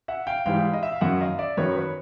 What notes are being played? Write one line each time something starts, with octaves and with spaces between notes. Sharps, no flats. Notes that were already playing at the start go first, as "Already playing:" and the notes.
E5 F#5
F5 G5
G#2 E3 G3 F5 G5
D#5
E5
F5
F#2 D#3 F#3 E5 F#5
D#5 F5
D5 E5
F#2 D#3 F#3 B4 C#5
B4 C#5